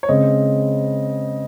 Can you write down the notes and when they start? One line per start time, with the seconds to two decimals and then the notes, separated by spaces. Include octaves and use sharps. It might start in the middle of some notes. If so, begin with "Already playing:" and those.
0.03 C#5
0.09 C#3 G#3 C4 D#5